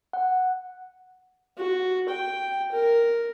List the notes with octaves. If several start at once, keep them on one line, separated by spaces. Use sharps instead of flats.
F#5
F#4
G5
A#4